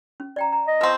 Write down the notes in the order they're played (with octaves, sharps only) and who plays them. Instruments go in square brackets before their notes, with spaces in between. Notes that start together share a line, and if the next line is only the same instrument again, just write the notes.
[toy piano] C#4
D5 G5 A#5
A#5
[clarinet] D#5
[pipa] F3 C4 [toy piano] B4 C#6